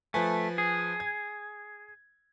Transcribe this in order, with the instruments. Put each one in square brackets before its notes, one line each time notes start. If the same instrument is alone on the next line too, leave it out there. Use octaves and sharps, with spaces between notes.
[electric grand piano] F3 B4 G#5 [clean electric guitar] A3
[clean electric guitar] G#4
[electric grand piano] G#6